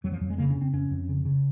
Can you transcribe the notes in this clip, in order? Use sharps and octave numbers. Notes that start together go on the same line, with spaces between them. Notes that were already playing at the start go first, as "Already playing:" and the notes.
F2 F#3
F3
F2 F#3
G#3
C#3 A#3
C#4
C#3 C4
F2 C#4
F2
C#3
C#3